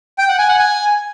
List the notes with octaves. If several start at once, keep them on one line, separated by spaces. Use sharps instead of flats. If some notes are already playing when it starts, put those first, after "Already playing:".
G5
F#5
G#5
F#5
G#5